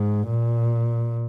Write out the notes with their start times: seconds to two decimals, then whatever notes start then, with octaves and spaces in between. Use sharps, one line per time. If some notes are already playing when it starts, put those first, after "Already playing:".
Already playing: G#2
0.28 A#2